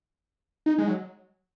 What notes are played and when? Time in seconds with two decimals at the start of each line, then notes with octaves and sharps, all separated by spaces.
0.66 D#4
0.78 G#3
0.88 F#3